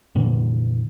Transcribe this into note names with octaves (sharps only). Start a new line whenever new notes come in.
F2 A#2 D3 E3